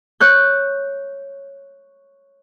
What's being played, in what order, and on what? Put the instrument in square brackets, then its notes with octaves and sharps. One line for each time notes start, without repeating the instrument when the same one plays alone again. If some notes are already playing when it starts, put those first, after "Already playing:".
[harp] C#5 F#6 G6